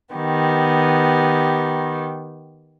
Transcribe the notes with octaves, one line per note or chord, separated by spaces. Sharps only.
D#3 B3 G4